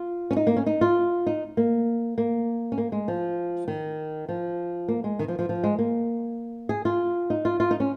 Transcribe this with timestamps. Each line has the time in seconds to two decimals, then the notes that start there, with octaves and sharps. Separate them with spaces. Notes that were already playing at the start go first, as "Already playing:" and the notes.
Already playing: F4
0.31 C#4
0.37 D#4
0.47 A#3
0.56 C#4
0.66 D#4
0.81 F4
1.26 D#4
1.57 A#3
2.18 A#3
2.72 C#4
2.78 A#3
2.92 G#3
3.08 F3
3.68 D#3
4.29 F3
4.88 A#3
5.04 G#3
5.19 D#3
5.28 F3
5.39 F3
5.49 F3
5.64 G#3
5.79 A#3
6.69 G#4
6.85 F4
7.30 D#4
7.45 F4
7.60 F4
7.71 D#4
7.80 C#4